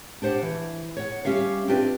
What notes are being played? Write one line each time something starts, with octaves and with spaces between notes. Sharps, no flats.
D4 G4 C5 F#5
E3
C#5 F#5
G3 C#4 G4 E5 F5
C4 D4 F4 G4 B4 D5